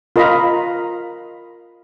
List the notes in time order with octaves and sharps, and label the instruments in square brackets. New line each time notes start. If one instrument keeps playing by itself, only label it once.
[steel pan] F4 A#4 D#5 F5 A#5 B5